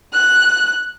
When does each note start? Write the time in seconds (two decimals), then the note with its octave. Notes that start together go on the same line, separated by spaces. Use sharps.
0.13 F#6